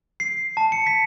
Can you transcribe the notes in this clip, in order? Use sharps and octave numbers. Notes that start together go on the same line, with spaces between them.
C7
A5
C#7
B6